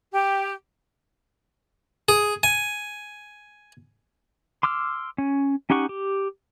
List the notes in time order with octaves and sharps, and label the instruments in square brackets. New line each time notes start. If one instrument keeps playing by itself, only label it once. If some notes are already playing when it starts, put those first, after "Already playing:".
[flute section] G4
[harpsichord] G#4
G#5
[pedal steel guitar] C6 D6 E6 F6
C#4
C#4 D#4 G4 F#5 C#6
G4